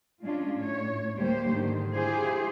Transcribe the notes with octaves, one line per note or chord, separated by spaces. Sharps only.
G#3 C#4 D4 F4
A2 C#5
D2 G3 A3 A#3 G4 C5
G#2 D3 D#3
E4 F4 G4 G#4 C5